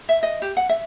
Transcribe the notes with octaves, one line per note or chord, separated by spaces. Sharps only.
E5
D#5
G4
F#5
E5